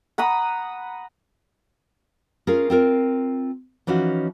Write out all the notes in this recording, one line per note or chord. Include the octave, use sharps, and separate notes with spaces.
F#5 A#5 B5 D#6
C#4 F4 G#4 A#4
C4 F4 A#4
E3 F3 C#4 D#4 F#4